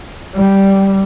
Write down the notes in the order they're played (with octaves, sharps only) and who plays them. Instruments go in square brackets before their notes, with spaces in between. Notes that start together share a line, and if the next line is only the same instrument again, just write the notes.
[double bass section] G3